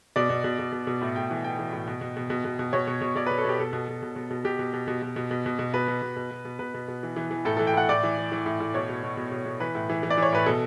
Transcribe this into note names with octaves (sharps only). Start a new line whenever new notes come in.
B2 D5
B2
B2
B2
B2
B2
A2
A2 G5
E3
E3 G5
E3
A2
B2
B2
B2
B2
B2
B2
B2 C#5
B2
B2
B2 D5
B2 B4
A4
B2 G4
B2 A4
B2
B2
B2
B2
B2
B2 G4
B2
B2
B2
B2
B2
B2
B2
B2
B2 B4
B2
B2
B2
B2
B2
B2 B4
B2
B2
E3
E3
E3
A2 A4
E3 A4
G5
A2 F#5
A2 D5
E3
E3
E3
A2
A2
B2 C#5
B2
B2
B2
B2
B2
E3 B4
A2
E3
E3
D5
E3
C#5
A2 B4
B2 A4